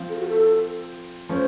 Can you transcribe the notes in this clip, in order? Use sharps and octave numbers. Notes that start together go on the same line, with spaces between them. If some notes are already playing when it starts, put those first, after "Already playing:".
Already playing: F3 C4 F4
A4
F#4
A4
F3 A3 C#4 C5